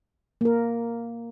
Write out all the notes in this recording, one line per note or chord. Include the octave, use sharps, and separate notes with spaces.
A#3 A#4